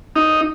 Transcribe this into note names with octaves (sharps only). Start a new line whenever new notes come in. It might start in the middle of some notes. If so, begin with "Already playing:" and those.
D#4